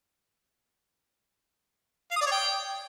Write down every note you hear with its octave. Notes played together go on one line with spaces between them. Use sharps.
F5
D#6
D5
C#5
G5